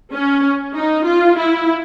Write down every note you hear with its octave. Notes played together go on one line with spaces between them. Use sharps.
C#4
D#4
F4
E4